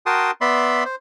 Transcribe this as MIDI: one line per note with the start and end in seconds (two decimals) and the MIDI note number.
0.06 0.31 66
0.06 0.31 70
0.06 0.31 79
0.06 0.31 81
0.06 0.31 84
0.06 0.31 87
0.41 0.84 59
0.41 0.84 74
0.41 0.84 76
0.41 0.84 83
0.41 0.84 84
0.85 0.95 72